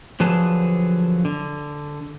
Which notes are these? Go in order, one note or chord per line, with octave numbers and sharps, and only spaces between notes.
D3 F3 F#3 G#4 B4 A5
D3